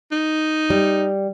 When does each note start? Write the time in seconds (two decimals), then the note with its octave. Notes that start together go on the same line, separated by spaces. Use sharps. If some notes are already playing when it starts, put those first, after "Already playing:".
0.12 D#4
0.70 G3